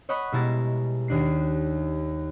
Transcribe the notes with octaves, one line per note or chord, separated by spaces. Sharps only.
C#5 D#5 F#5 B5 C#6 D#6
B2 G3 G#3 E4 A#5 A6
D#2 D4 C7